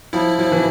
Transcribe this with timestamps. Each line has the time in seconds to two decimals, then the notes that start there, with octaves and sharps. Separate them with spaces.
0.13 F3 E4
0.39 F3 E4
0.52 E3